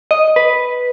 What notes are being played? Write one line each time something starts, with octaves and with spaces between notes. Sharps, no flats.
D#5
B4